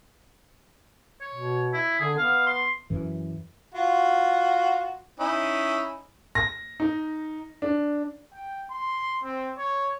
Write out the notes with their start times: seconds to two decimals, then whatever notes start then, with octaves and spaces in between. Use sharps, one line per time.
1.21 C#5
1.35 B2
1.74 E4
2.00 D3 G#4
2.17 B3 F5
2.47 C6
2.90 F#2 E3
3.74 F4 F#4
5.20 C#4 D#4 E4
6.35 A#6
6.80 D#4
7.62 D4
8.33 G5
8.71 C6
9.24 C4
9.58 C#5